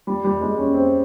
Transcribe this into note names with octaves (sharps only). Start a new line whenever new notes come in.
G3
G3
G#3
C#4
C4